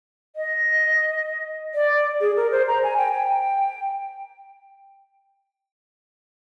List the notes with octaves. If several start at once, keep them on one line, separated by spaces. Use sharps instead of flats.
D#5
D5
G#4
A#4
C5
A#5
G#5
G5
G5